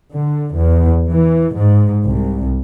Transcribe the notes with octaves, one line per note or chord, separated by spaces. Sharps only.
D3
E2
E3
G#2
C2